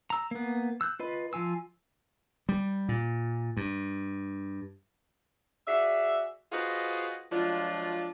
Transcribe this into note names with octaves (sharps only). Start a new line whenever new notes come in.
A#5 E6
A#3 B3
E6 F#6 G6
F4 B4 D#5 B5
F3 F4 G#5 E6
G3
A#2
G2
F#4 G#4 D5 E5
F4 F#4 G#4 B4 C5 D#5
F3 F#3 G#3 D4 F4